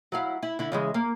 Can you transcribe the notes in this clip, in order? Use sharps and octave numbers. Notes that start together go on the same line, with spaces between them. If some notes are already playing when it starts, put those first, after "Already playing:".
F#3 E4 F5
E4
D3 E4
C#3 E3 G#3
A#3